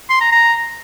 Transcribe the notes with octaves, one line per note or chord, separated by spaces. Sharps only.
C6
A#5
A#5